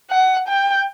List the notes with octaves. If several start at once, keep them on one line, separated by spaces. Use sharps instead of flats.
F#5
G5